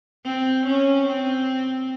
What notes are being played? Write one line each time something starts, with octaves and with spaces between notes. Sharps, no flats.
C4
C#4
C4